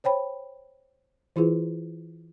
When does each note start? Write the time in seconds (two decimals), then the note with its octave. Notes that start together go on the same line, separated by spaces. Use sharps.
0.04 C5 C#5 G5 B5
1.36 E3 E4 F4 G#4 B4